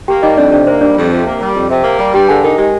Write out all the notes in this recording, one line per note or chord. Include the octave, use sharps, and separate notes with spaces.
A#3 G4 G5
G3 D#4 D#5
F2 D4 D5
C3 D4 D5
A#3 C5
G3 D4 D5
F2
C3
A#3
G3
F2
C3
A#3
G3
G2 G4 G5
D3 G#4 G#5
D#4 A#4
G#3 G4